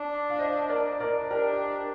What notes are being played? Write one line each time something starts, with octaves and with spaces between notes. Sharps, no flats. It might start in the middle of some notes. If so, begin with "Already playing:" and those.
Already playing: D4
F5
C5 D#5
A#4 D5
D4 A#4 D5
G4 A#4